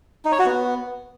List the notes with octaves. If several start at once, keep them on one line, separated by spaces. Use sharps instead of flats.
D#4
C#5
F#4
B3